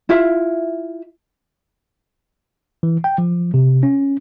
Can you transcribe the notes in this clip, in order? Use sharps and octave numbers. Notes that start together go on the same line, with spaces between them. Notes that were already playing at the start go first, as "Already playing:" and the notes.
E4 F4 E5
E3
G5
F3
C3
C#4